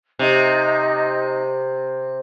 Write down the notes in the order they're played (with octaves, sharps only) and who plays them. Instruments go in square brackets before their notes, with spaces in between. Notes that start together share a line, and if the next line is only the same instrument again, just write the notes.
[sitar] C3 [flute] D#4